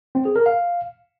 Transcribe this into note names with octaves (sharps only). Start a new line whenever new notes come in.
C4
G#4
A#4
F5